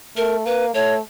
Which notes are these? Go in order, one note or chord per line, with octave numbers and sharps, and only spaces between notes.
A3 A#4
A#3 B4
A3 C#5